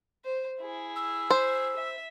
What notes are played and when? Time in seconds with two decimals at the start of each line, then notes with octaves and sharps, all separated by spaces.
0.24 C5
0.61 E4 G#4
0.95 E6
1.30 C5
1.75 E5